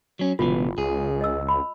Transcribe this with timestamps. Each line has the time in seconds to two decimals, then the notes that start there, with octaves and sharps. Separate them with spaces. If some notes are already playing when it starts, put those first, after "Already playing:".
0.19 F#3 C#4
0.39 G1 C#2 B2 E3 F4
0.78 C#2 G#4
1.21 D#5 E6
1.48 B5